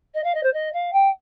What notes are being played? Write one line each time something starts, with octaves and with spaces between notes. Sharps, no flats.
D#5
F5
D#5
C5
D#5
F5
G5